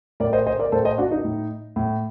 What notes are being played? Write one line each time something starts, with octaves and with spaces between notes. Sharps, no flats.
A2 A#4 D5
C5 D#5
C5 D#5
A#4 D5
A2 A4 C5
C5 D#5
D4 F#4
D#4
A2
A2